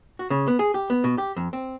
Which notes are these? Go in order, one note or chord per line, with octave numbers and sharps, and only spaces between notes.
F#4
C#3
B3
G#4
G4
B3
B2
G4
F2
C4